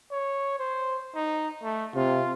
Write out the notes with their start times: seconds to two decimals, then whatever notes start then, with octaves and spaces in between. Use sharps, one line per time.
0.11 C#5
0.59 C5
1.15 D#4
1.63 A3
1.95 C3 F4